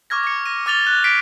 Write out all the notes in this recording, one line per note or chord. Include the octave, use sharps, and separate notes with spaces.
C#6 D6 F6 G#6 A#6
D6 C#7
A#6 D#7
D6 F6 A6 F7 G7
F#6
B6 C7 D7 F7